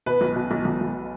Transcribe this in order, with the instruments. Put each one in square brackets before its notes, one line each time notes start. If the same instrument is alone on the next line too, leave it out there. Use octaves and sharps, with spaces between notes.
[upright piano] B2 B4
B1
B2
B1
B1
B1